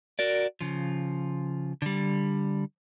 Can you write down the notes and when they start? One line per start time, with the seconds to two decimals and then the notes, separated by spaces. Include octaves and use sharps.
0.19 F#4 A#4 D5
0.61 C#3 F3
1.82 D3 G3